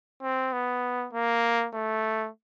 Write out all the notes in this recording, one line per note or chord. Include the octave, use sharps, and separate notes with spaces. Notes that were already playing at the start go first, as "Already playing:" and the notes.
C4
B3
A#3
A3